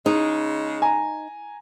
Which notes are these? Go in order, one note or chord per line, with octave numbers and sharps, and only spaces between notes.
C#3 G#3 D#4
G#5 A#5